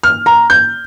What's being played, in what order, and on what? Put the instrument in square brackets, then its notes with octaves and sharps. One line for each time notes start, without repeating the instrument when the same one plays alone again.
[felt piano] F6
A#5
G6